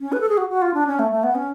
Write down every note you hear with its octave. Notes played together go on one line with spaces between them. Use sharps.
C#4
B4
A4
G#4
F#4
F#4
F4
D4
C#4
A3
A3
B3
C#4